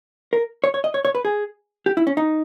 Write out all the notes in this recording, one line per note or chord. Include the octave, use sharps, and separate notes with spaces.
A#4
C#5
C#5
D#5
C#5
C#5
B4
G#4
G4
E4
C#4
D#4